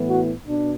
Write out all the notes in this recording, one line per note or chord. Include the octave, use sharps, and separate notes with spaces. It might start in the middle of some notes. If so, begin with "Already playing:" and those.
Already playing: A2 E3 B3
F#4
B2 D4